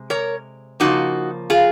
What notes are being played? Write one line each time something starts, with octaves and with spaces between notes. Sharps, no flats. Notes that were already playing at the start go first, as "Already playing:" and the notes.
Already playing: C3 G#3
A#4 C#5
C#3 F3 A#3 D#4 F#4
F4 G#4